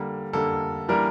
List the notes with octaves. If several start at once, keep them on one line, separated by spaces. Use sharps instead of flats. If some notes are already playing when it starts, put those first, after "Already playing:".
Already playing: D3 G3 A#3
D3 G3 A#3 A4
E3 G3 A#3 D4 A#4